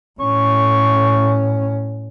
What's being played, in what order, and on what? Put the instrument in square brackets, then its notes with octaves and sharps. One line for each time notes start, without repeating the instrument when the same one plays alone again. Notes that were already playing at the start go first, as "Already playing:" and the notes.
[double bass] A2 C#4 [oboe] C#6